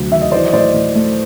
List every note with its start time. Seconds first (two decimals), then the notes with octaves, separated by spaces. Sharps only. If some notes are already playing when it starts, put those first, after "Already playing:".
Already playing: D2 C3 F#3
0.11 D#3 E5
0.22 D#5
0.31 E3 C5 D5
0.48 D#5
0.53 A2 C5 D5
0.74 A2
0.95 A3